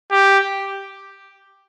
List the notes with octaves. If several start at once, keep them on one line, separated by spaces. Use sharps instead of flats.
G4